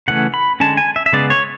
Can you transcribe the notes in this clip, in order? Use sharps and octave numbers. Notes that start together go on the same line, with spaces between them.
C#3 E3 A3 C#4 F#5
B5
D3 G#3 C#4 A5
G#5
E5
E5
C#3 G#3 B3 D5
C#5